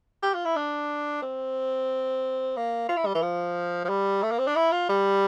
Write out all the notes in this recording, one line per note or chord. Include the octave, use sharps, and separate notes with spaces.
G4
F4
E4
D4
C4
A#3
F4
E4
G3
E3
F3
F3
G3
A3
A#3
C4
D4
E4
F4
G3